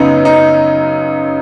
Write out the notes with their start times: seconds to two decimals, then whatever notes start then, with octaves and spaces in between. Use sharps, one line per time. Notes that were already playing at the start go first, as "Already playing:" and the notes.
Already playing: F#2 C#3 B3 D#4
0.25 D#4